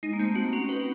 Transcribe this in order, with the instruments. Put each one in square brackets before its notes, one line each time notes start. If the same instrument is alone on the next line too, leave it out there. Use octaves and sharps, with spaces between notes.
[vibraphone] G#3 [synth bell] D#4
[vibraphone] A#3
[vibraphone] A3 [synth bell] C4
[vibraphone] A#3 [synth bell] F#4
[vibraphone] C#4 [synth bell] F#4
[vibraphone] D#4 [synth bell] B4